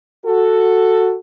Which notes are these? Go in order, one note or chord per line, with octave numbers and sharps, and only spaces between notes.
F#4 A4